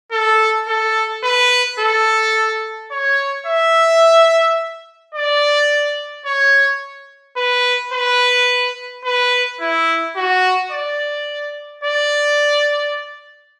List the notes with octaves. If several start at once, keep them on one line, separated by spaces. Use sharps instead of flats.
A4
A4
B4
A4
C#5
E5
D5
C#5
B4
B4
B4
E4
F#4
D5
D5